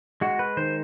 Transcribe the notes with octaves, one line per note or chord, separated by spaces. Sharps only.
G#3 F#4
B4
D#3 C5